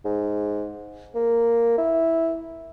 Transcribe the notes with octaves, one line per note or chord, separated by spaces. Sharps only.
G#2
A#3
E4